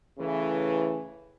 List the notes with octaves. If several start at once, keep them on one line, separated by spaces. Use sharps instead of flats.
A2 C#3 E3